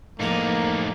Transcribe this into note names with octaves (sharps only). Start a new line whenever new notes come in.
E2 A2 F3 A#3 D#4 D6